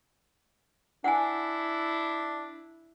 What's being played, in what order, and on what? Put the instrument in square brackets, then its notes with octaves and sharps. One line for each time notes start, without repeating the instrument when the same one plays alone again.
[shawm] D4 [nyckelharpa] E4 [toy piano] F#5 G#5